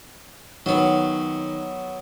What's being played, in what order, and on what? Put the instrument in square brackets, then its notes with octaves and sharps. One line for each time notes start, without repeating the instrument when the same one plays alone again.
[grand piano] D#3 [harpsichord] F#3 B3